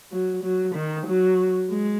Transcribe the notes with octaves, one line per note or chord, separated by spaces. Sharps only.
F#3
F#3
D#3
F#3
G#3